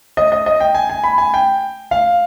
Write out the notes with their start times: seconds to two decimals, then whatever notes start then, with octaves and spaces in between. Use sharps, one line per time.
0.17 D#5
0.32 D#5
0.46 D#5
0.60 G5
0.75 G#5
0.89 G#5
1.04 B5
1.18 G#5
1.34 G5
1.91 F5